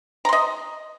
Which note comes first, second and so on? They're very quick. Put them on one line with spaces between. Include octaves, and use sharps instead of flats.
A#5 C6 D#5